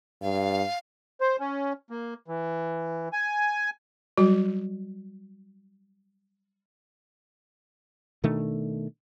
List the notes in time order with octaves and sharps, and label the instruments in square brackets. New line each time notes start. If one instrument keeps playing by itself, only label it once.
[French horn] G2 [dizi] F5
[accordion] C5
C#4
A#3
E3
G#5
[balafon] F#3 G3 F#4
[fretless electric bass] B2 D#3 A3 D4